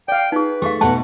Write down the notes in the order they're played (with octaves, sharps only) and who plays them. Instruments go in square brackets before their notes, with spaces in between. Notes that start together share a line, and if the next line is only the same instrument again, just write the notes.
[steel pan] D5 F5 [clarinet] G5
[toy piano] D#4 G#4 [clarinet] B4
[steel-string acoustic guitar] A3 [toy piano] G4 G#4 F5
[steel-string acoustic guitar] G#2 B2 [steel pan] A3 B3 [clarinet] F#5 [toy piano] A5